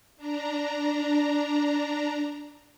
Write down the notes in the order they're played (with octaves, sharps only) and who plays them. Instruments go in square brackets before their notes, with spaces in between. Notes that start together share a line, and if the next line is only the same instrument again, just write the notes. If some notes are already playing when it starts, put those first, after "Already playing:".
[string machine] D4 A#5